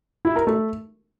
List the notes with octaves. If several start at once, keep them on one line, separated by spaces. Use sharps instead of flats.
E4
A#4
A3